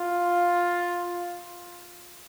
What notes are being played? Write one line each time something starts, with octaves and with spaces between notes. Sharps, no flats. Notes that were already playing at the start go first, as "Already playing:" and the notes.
Already playing: F4